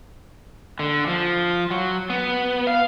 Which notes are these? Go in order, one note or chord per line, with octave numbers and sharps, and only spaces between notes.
D3
F3
F#3
B3
F5